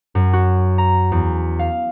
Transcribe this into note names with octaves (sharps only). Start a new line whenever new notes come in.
F#2
F#4
A#5
E2
F5